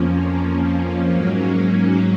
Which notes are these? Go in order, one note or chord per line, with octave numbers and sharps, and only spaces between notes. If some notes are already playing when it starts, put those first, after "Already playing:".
Already playing: F2 F3 A#3 C#4
G#2 F#3 A#3 C#4